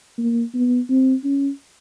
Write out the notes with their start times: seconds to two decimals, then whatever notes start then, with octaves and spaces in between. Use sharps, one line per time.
0.18 A#3
0.55 B3
0.90 C4
1.24 C#4